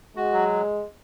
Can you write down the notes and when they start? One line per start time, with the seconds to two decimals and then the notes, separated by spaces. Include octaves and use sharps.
0.16 G#3 F#4
0.33 F#3